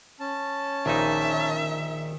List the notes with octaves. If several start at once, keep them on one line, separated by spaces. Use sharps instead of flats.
C#4 A5
A#1 A#2 D#3 D#4 E5